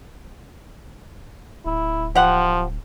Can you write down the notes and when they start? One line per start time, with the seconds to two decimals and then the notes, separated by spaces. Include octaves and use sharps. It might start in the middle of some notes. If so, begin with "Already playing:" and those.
1.66 D1 E4
2.15 F3 G4 F#5